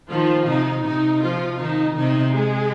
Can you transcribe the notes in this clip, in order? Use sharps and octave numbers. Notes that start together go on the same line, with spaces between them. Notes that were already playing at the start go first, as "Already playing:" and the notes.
D#3 F3 F4
C3 D#4
C3 D#4
F3 F4
D#3 D#4
C3 D#4
G#3 G#4